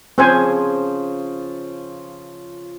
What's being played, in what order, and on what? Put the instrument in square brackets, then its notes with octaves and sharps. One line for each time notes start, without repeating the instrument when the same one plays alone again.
[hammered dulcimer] C#3 F3 [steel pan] C4 C5 G#5